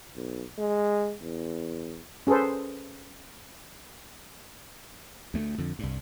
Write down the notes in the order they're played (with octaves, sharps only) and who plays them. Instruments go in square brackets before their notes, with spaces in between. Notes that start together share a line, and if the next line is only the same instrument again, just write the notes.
[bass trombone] B1
G#3
E2
[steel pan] C#4 G#4 A4 B4 C5
[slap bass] D2 A3
F2 D3
C2 G2